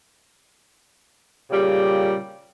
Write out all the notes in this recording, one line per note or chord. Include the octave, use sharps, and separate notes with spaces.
A#2 C#3 G3 G4